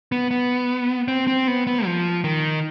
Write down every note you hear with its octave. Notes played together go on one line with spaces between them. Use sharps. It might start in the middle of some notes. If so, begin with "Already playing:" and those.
B3
B3
C4
C4
B3
B3
F3
D#3